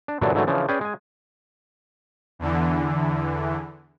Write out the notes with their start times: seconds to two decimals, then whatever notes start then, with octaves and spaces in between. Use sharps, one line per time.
0.08 D4
0.21 G2 A#2 D3 E3 F#3 D4
0.34 G#2 D3 E3 F#3 A3
0.47 C#3 E3 F3 D4
0.69 C#4 G#4 B4 D5 G5
0.81 G#3 G#5
2.39 E2 D3 E3